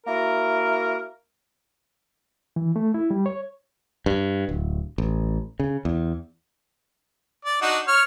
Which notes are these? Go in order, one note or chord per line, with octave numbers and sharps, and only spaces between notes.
A#3 E4 F#4 A#4
E3
A3
E4
G3
C#5
G2
D1
A1
C#3
E2
D5
D4 D#4 F#4
C#5 F6